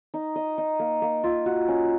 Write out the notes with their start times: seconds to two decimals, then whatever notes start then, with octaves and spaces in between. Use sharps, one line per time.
0.14 D#4
0.36 D#5
0.58 D#4
0.79 A#3
1.02 A#3
1.24 F4
1.46 F#4
1.68 C#4